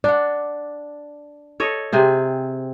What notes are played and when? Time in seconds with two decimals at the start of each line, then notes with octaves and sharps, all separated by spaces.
0.04 D4 D5 F#5
1.60 A4 C#5 D#5
1.92 C3 C4 G#4